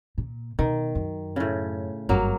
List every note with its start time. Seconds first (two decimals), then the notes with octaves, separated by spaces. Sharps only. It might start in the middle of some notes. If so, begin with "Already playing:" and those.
0.18 A#2
0.59 B2 D#3
0.95 F#2
1.36 A2 C#3
2.09 G1 F#2 F#3 A#3